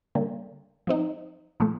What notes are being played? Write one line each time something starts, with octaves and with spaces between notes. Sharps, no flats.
D3 G3 A#3
F3 C4 D#4
A#2 F3 A3